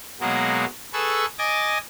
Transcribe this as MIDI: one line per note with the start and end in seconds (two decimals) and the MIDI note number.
0.21 0.65 47
0.21 0.65 54
0.21 0.65 56
0.21 0.65 58
0.21 0.65 66
0.93 1.25 68
0.93 1.25 69
0.93 1.25 71
0.93 1.25 85
0.93 1.25 88
1.38 1.78 75
1.38 1.78 80
1.38 1.78 86
1.38 1.78 93
1.38 1.78 94